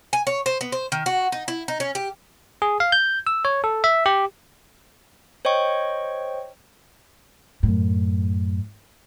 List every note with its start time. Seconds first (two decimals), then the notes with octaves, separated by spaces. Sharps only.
0.13 G#5
0.27 C#5
0.46 C5
0.61 B3
0.72 C5
0.92 D#3
1.06 F#4
1.32 D#4
1.48 E4
1.68 D#4
1.80 C#4
1.95 G4
2.62 G#4
2.80 F5
2.92 G6
3.27 E6
3.45 C#5
3.64 A4
3.84 E5
4.06 G4
5.45 C5 C#5 D#5 G5 C#6
7.63 F#2 A2